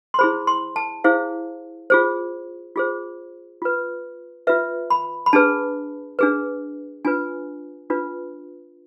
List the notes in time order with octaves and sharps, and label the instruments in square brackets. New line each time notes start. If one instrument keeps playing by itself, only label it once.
[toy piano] C6
E4 G#4 C5 B5
C6
A5
E4 G#4 C5 F5
F4 G#4 C5
F4 G#4 C5
F4 B4
F4 B4 E5
B5
B5
D4 G#4 B4 A5
D4 G#4 B4
D4 F4 B4 G#5
D4 F4 B4